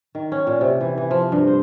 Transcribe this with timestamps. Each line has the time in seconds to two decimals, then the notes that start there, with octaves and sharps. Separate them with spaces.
0.15 D#3
0.32 C#4
0.47 A#2
0.61 C3
0.81 E3
0.98 E3
1.11 F3
1.32 G2
1.47 C5